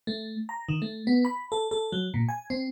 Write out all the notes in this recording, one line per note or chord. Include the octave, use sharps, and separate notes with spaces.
A3
A#5
D#3
A3
B3
B5
A4
A4
F#3
A#2
G#5
C4